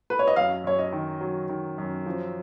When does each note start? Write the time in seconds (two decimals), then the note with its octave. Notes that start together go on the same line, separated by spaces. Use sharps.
0.10 B4
0.19 C#5
0.27 D#5
0.36 F#2 F5
0.64 F#2 C#5
0.79 D#5
0.92 D#3
1.21 F#3
1.49 D#3
1.78 F#2
2.06 F3